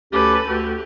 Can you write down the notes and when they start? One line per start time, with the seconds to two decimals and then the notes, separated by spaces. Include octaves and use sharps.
0.12 D2 C#4 G4 A4 B4
0.48 D2 F#4 G4 A4